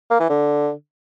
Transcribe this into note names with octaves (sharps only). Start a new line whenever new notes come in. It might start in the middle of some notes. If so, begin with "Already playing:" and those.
A#3
E3
D3